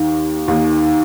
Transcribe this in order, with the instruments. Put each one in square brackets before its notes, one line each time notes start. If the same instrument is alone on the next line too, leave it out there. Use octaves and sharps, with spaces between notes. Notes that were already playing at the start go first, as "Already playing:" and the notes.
Already playing: [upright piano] D#2 D#3
D#2 D#3